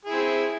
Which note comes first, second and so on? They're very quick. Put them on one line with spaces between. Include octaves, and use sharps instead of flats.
G#4 E4 C4